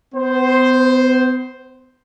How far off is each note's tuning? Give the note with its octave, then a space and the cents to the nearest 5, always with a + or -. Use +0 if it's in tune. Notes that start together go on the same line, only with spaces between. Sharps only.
B3 +45 C5 +0